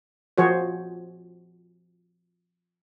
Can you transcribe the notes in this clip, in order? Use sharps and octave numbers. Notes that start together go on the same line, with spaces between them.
F3 F#4 G#4 C5 C#5